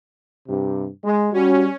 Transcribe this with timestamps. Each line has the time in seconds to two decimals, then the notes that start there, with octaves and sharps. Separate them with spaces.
0.47 G2 C3
1.04 G#3
1.34 G3 C#4 F#4